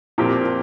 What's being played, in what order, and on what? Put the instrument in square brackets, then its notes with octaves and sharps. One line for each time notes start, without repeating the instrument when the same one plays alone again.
[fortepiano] A#2 F3 C4 G4 A#4